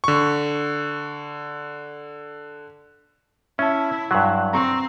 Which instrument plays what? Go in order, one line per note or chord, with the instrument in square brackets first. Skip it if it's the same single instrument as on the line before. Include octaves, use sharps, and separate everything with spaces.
[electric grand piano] D3 C#6
[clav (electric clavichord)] C#4 [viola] E4 [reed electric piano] E5 A5
[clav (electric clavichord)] G2 F#3 [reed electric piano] F#5 C6 F#6
[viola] C4 [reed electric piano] A#5 C#6